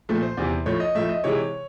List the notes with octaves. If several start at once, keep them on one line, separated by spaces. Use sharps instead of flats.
A#2 F3 A3
C5
E2 C3 E3
A2 F3 A3 C#5
D#5
A2 F3 A3 E5
D#5
C3 E3 G#3 C#5